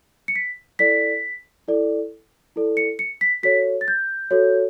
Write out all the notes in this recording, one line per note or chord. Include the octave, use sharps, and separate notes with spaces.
C#7
B6
E4 A4 D5 B6
E4 A4 D5
E4 A4 D5
C#7
C#7
B6
F#4 A4 C#5 B6
A6
G6
F#4 A4 C#5